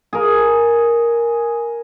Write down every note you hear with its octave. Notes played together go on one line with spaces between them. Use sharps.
G#4 A#4